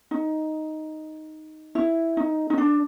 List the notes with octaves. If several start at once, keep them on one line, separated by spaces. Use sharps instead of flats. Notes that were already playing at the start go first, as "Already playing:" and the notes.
D#4
E4
D#4
D#4
D4